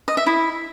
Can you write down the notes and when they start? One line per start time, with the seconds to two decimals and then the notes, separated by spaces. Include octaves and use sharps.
0.08 D#5
0.17 E5
0.26 E4